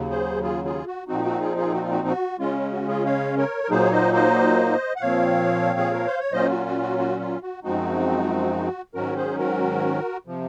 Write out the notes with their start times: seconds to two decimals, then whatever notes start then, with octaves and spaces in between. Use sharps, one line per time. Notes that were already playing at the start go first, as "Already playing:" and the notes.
Already playing: D#2 C#3 F#3
0.10 G#4 C5
0.43 F4 G#4
0.65 F4 G#4
0.87 F#4
1.08 A#2 F3 C4 D#4 F#4
1.25 F#4
1.41 F4 G#4
1.58 F4 G#4
1.75 F#4
1.82 F4
1.91 F#4
2.07 F#4
2.39 C#3 G#3 C#4 F4
2.72 F#4
2.88 F4 G#4
3.06 C#5 F5
3.37 A#4 C#5
3.64 A#4
3.70 A#2 F#3 A#3 D#4 G#4 C5
3.85 C#5
3.92 C5 D#5
4.14 C5 D#5
4.96 F#5
5.01 A#2 F3 C4 C#5 F5
5.79 G#4
5.94 A#4
6.07 C5
6.20 C#5
6.32 A#2 F#3 C#4 F4 C5 D#5
6.50 F#4
6.66 F#4
6.81 F#4
6.98 F#4
7.20 F4
7.42 F#4
7.63 F#2 F3 G#3 C4 D#4 F#4
8.94 G#2 D#3 F#3 C#4 F#4 A#4
9.16 G#4 C5
9.39 F#4 A#4
10.26 C3 F3